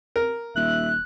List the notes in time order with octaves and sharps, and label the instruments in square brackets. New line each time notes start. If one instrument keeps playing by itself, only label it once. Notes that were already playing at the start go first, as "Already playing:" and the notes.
[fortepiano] A#4
[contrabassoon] D#1 [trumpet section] E5 [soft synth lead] F#6